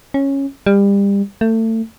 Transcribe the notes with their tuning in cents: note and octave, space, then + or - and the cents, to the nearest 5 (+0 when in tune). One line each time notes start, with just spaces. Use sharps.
C#4 -10
G3 +30
A3 +30